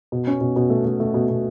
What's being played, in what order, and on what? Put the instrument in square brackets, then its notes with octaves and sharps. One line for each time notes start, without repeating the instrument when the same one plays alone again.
[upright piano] B2
C#4
B2
B2
A3
A3
A3
B2
B2